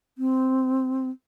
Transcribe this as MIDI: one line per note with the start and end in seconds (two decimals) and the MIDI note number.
0.18 1.09 60